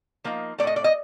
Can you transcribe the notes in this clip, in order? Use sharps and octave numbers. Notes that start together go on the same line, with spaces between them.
F3 A#3 D#4
A2 F3 A3 D5 D#5
D5
D#5